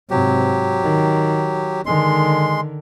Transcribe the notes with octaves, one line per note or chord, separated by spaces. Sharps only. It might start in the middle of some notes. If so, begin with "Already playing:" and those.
G#2 C3 F#3 G4
D#3
D3 D#3 G#3 C6